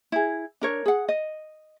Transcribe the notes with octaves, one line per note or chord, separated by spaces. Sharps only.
E4 G#4
D4 A#4 C#5
G#4 F#5
D#5